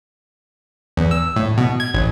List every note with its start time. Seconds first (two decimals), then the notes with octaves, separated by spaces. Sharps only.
0.97 E2
1.11 E6
1.36 A2
1.57 B2
1.80 G#6
1.94 A1